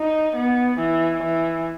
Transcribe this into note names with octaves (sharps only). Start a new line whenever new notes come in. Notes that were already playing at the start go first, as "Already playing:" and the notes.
Already playing: D#4
B3
E3
E3